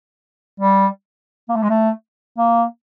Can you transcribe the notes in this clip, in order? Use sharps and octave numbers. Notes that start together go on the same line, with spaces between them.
G3
A#3
A3
G#3
A3
A#3